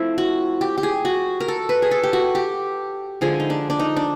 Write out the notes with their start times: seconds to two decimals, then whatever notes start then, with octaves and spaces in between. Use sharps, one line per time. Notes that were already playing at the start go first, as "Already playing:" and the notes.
Already playing: F3 A3 C4 E4
0.18 F#4
0.61 G4
0.78 G4
0.83 G#4
1.05 F#4
1.40 A#4
1.48 A4
1.69 B4
1.82 G#4
1.91 A4
2.03 G4
2.13 F#4
2.35 G4
3.21 D3 F3 G#3 G#4
3.40 D#4
3.50 D4
3.70 D4
3.79 D#4
3.96 D4